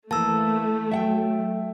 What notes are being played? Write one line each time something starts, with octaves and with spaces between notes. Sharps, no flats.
E3 A3 A#3 A5 E6
F#3 E5 F#5 G5